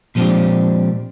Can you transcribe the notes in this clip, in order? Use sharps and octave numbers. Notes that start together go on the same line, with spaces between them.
A#2 F3 G#3 C4 D4 G4